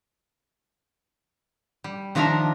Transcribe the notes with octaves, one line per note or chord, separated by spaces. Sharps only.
G3
D#3 F3 D4 A#4 E5 A#5